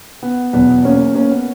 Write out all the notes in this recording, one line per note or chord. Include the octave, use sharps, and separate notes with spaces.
B3
E2 B2 F#3 B3
A#3 C#4
A#3 C#4
B3